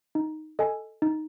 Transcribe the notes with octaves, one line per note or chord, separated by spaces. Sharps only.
D#4
A4 D#5 G#5
D#4